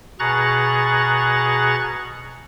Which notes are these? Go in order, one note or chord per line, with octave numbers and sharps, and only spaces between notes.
B2 G#4 A#5 C#6 F#6 A6